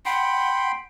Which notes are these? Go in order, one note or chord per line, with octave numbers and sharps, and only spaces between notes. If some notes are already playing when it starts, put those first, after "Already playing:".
F#5 G5 B5 C6